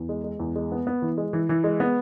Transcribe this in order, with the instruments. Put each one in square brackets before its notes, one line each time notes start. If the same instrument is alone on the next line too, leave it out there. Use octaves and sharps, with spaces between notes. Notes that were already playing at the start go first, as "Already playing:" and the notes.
Already playing: [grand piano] E2
G#3
G#3
E2
G#3
B3
B3
E3
G#3
E3
E3
G#3
B3